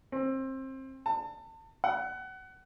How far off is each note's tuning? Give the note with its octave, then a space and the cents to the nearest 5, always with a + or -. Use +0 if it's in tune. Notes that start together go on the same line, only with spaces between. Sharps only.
C4 +25
A5 +35
F#5 +25